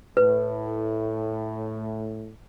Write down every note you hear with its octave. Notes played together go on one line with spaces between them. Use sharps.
A2 B4